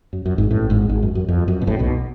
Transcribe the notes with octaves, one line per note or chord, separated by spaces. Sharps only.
F#2
F#2
G#1 G#2
A1 A2
G#1 G#2
G#1 G#2
F#2
F#2
F2
F#2
B2
A1 A2
B1 B2